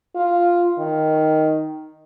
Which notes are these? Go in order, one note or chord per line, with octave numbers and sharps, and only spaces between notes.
F4
D#3